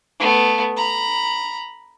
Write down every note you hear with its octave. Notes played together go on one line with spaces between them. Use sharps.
A3 B3
A#5 B5